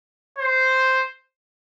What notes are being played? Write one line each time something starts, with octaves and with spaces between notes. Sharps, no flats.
C5